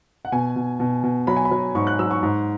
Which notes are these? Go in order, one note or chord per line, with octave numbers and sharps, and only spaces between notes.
F#5
B2 G#5
B2
B2
B2
F#3 B5
G#5
B5
F#3
G#2 C#6
F#6
F#3 E6
C#6
G#2